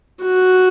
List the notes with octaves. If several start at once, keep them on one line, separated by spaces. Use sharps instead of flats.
F#4